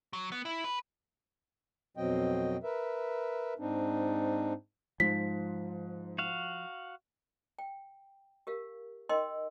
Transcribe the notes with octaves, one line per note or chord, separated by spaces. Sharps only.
F#3
B3
E4
B4
F2 B2 F#3 C4 D#5 G5
A#4 B4 E5
G#2 C4 D4 D#4
G#2 F3 B6
F#4 F5
G5
G4 A#4 F5
D#4 A#4 D#5 G5 C6 E6